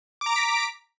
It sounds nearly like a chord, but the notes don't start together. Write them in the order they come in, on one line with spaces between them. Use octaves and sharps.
D6 A#5 D7 B6